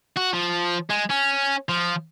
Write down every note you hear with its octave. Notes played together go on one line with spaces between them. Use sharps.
F#4
F3
G#3
C#4
F3